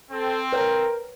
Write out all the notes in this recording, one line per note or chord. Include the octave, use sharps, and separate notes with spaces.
C4 A4
A#4 B4 C#5 F#5